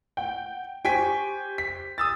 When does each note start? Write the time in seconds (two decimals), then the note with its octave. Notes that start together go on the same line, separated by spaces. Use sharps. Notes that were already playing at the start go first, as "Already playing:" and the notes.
0.17 F#5 G5
0.85 G4 C5 G5 G#5 C#6 B6
1.58 B6
1.98 D#6 E6 A6